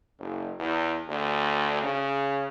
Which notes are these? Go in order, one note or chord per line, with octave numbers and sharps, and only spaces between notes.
F#1
E2
D2
C#3